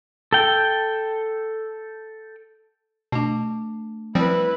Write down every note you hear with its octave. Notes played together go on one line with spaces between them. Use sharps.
A4 G5
B2 A3 D4
F3 G3 C4 E4 B4